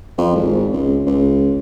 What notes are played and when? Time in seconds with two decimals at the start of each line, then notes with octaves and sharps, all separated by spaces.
0.18 F2
0.36 G#1
0.73 C#2
1.07 C#2